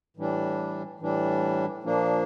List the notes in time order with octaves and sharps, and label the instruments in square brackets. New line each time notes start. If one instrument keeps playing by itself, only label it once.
[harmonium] A2 E3 G3 D4
A2 E3 G3 D4
A#2 F3 A#3 D4